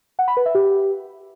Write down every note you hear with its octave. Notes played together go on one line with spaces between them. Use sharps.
F#5
B5
B4
E5
G4